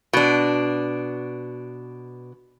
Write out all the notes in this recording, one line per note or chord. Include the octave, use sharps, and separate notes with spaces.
B2 D4